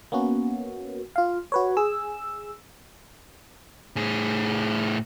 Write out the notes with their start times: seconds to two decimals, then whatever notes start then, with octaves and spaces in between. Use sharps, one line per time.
0.12 A#3 B3 C#4 F#4
1.16 F4 F5
1.52 F#4 B4 C#5
1.77 G#4 E6
3.96 A2 G#4